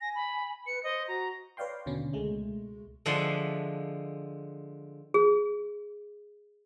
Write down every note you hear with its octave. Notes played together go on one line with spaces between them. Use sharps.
G#5 A#6
B5
B4 C#7
C5 D#5
F#4 A#5
B4 C#5 D5 F5 G5 C6
D#2 B2 D3 C#4
C#2 B2 G#3 A3
D3 F3 G#3 E5 F#5 C6
G#4